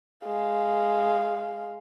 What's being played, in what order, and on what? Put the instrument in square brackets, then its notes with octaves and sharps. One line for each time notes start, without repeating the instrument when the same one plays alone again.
[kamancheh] G#3 F5